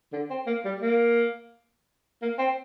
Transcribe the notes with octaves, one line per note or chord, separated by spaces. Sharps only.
D3
C4
A#3
G3
A#3
A#3
C4